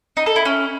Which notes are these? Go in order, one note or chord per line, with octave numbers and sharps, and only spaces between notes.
D#4
A4
E4
C#4